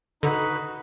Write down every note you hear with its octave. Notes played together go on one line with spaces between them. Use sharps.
D3 D#4 F#4 B4